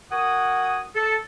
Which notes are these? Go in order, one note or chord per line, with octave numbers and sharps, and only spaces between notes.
F#4 A#4 F#5 G#5 D#6
A4